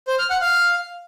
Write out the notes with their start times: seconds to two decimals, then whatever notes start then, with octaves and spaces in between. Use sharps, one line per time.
0.07 C5
0.19 F6
0.30 F#5
0.41 F5